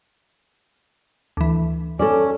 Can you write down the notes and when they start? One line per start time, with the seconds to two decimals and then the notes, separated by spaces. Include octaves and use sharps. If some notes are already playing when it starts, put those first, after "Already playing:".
1.37 D2 E3
1.99 C#4 A4 D5